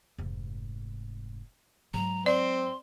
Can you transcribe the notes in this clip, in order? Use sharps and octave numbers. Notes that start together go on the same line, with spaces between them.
F1 G#2
G#2 F#3 A#5
C4 D5 C6